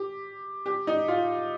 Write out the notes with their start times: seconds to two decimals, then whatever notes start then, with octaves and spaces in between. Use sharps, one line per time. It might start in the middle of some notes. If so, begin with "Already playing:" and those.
Already playing: G4
0.66 G4
0.87 D#4
1.08 F4